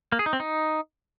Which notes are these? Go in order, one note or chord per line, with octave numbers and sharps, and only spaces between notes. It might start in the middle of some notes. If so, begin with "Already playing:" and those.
A#3
G#4
D#4
C4
D#4